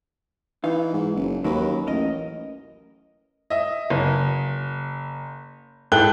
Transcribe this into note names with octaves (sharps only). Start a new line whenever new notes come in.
E3 D#4 F5
G#2
F#1
D#2 F#3 A#4 B4
A1 A#4 D#5
D#5 E5
F#1
G#2 E4 A4 G5 F#6 G7